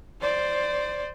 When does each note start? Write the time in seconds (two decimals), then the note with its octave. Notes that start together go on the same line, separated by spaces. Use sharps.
0.21 C5 D5